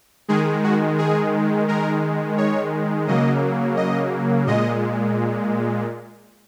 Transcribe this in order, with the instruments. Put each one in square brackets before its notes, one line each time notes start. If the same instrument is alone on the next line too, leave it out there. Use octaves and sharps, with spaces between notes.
[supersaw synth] D#3 G#3 G#4
F#4
G#4
D#3 G#3 A#4
C#5
C#3 F#3 A#3 D#5
D#5
A#2 G#3 D#5